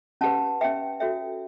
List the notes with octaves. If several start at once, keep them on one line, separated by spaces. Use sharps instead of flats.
C#4 G4 B4 F#5 A5
C#4 G4 B4 E5 G5
F#4 A4 C#5 E5 G5